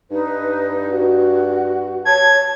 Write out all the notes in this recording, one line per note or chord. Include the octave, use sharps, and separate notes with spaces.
G2 D#4 B4
F#4
C#5 A5 G#6